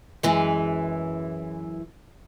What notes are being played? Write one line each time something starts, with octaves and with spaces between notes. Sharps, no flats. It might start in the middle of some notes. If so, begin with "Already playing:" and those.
F#2 E3 G#3